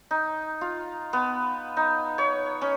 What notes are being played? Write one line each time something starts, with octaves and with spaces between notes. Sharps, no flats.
D#4
F4
B3
D#4
C#5
C#4